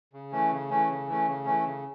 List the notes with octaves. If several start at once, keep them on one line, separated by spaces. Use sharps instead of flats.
C#3
E3 A3 C#4
C#3
E3 A3 C#4
C#3
E3 A3 C#4
C#3
E3 A3 C#4
C#3